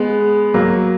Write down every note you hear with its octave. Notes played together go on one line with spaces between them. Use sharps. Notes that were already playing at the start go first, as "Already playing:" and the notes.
Already playing: G#3 B3
F#3 A#3